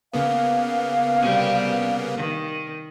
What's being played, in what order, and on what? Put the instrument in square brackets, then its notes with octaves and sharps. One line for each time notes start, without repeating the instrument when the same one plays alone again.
[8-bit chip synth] C#3 A#3 B3 [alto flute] F5
[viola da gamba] C3 G3 G4
D#3